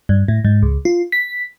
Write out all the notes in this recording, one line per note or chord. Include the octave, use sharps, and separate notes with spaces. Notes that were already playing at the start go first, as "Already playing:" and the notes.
G2
A2
G#2
C#2
F4
B6